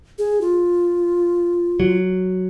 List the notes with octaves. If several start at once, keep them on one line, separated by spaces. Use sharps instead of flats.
G#4
F4
F#3